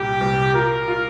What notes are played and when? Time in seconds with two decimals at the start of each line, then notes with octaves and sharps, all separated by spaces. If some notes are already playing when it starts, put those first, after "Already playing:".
Already playing: C2 A#2 G3 G4
0.21 C2
0.54 F4 A#4
0.88 F4